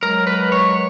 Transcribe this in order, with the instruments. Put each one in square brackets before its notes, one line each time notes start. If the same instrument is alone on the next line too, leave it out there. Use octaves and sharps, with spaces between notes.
[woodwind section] F#3 G#3 [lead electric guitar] A#4
[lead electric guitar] B4
C#5